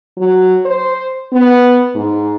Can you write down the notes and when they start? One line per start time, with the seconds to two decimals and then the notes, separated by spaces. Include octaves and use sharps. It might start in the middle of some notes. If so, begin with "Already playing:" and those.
0.17 F#3
0.65 C5
1.32 B3
1.95 G#2